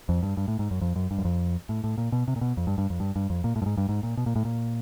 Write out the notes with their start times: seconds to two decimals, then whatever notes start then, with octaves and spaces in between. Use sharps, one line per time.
0.09 F2
0.23 G2
0.37 G2
0.48 A2
0.59 G#2
0.71 F#2
0.81 F2
0.96 F#2
1.11 G2
1.18 F#2
1.25 F2
1.69 A2
1.84 A2
1.98 A#2
2.12 B2
2.28 C3
2.36 A#2
2.41 B2
2.57 F2
2.67 G2
2.78 G2
2.90 F2
3.00 G2
3.16 G2
3.30 F2
3.44 A#2
3.56 A2
3.62 G2
3.66 G#2
3.77 G2
3.89 G#2
4.03 A#2
4.17 B2
4.26 A#2
4.36 A2
4.45 A#2